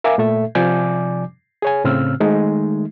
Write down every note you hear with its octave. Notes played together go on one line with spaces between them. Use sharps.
A#4 E5 F5 G#5 D6
A#2 A3 A4 E5
C3 F3 D5 G#5 D6 G6
G#4 C#5 G#5
A2 C#3 C4 E6 F6
D#3 G#3 A3 D#4